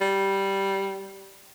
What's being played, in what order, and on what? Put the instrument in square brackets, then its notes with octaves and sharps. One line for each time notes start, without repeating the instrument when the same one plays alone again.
[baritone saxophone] G3